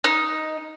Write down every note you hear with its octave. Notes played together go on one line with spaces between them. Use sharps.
D#4